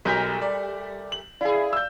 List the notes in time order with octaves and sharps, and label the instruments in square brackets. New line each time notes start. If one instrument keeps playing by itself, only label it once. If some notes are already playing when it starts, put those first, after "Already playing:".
[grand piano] B1 G6 B6 [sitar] G3 A3 A#4
[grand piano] D5
F#7
[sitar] E4 G#4 [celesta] D5 F5
[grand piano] E6 G6